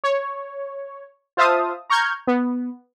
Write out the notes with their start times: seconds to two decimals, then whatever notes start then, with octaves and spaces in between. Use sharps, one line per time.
0.04 C#5
1.37 F4 C5 E5 F5 A5 D#6
1.90 A#5 C#6 F6 G6 G#6
2.27 B3